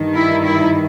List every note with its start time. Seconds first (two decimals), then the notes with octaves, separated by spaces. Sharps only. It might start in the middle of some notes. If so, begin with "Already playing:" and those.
Already playing: G2 D#3
0.15 E4
0.43 E4